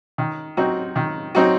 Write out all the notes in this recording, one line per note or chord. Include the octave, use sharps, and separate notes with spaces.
D#3
F#3 C4 D#4 F#4
D#3
F#3 C4 D#4 F#4